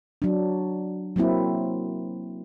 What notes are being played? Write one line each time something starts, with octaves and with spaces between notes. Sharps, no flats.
F#3 D4
F#3 A#3 C4 E4